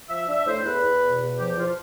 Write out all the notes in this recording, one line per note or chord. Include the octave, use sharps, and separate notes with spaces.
F3 E5
D4 E5
A2 C5
E2 B4
E2
B2
E2
F3 G4
F3 F4